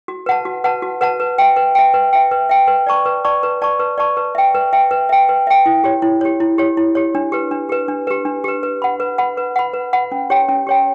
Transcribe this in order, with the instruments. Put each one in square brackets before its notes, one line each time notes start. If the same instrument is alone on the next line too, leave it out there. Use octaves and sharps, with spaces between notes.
[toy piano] F#4
B4 F#5 A5
F#4
B4 F#5 A5
F#4
B4 F#5 A5
B4
E5 G5
B4
E5 G5
B4
E5 G5
B4
E5 G5
B4
D5 A5 C#6
B4
D5 A5 C#6
B4
D5 A5 C#6
B4
D5 A5 C#6
B4
E5 G5
B4
E5 G5
B4
E5 G5
B4
E5 G5
E4
G4 C#5
E4
G4 C#5
E4
G4 C#5
E4
G4 C#5
D4
G4 B4
D4
G4 B4
D4
G4 B4
D4
G4 B4
B4
F#5 B5
B4
F#5 B5
B4
F#5 B5
B4
F#5 B5
C#4
G4 C#5 G5
C#4
G4 C#5 G5